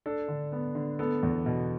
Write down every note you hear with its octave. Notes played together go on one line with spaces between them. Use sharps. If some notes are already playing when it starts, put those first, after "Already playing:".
D4 A4
D3
B3
D3
B3 A4
E2
B2